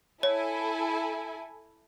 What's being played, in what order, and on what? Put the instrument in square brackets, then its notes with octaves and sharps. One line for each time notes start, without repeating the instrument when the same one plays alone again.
[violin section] E4 A4 G#5 [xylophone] C#5